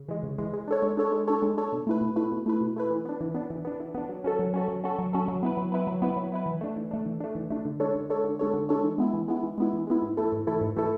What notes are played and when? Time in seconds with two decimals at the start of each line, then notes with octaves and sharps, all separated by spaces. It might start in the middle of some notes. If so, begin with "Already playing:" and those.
Already playing: C#3
0.09 E3 G#3
0.23 C#3
0.38 E3 G#3
0.53 G#3
0.68 D4 A4 C#5
0.82 G#3
0.97 D4 A4 C#5
1.12 G#3
1.27 D4 A4 C#5
1.42 G#3
1.57 D4 A4 C#5
1.73 B2
1.87 A3 E4 B4
2.01 B2
2.16 A3 E4 B4
2.32 B2
2.46 A3 E4 B4
2.61 B2
2.76 A3 E4 B4
2.91 E3
3.05 B3 D4
3.21 E3
3.35 B3 D4
3.50 E3
3.65 B3 D4
3.80 E3
3.95 B3 D4
4.09 F#3
4.24 C#4 F#4 A4
4.39 F#3
4.54 C#4 F#4 A4
4.68 F#3
4.84 C#4 F#4 A4
4.99 F#3
5.13 C#4 F#4 A4
5.28 F#3
5.43 B3 E4 B4
5.57 F#3
5.72 B3 E4 B4
5.87 F#3
6.02 B3 E4 B4
6.17 F#3
6.32 B3 E4 B4
6.46 E3
6.61 A3 D4
6.76 E3
6.91 A3 D4
7.06 E3
7.20 A3 D4
7.35 E3
7.50 A3 D4
7.65 D3
7.80 G#3 D4 A4 C#5
7.95 D3
8.10 G#3 D4 A4 C#5
8.24 D3
8.39 G#3 D4 A4 C#5
8.54 D3
8.69 G#3 D4 A4 C#5
8.84 E3
8.98 G#3 B3 E4
9.14 E3
9.28 G#3 B3 E4
9.43 E3
9.58 G#3 B3 E4
9.73 E3
9.87 G#3 B3 E4
10.02 G#2
10.17 E3 A3 E4 A4
10.32 G#2
10.47 E3 A3 E4 A4
10.61 G#2
10.76 E3 A3 E4 A4